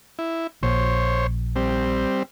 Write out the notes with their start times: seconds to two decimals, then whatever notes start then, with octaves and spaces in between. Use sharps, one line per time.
0.19 E4
0.63 A#1 C5 C#5
1.56 G3 C4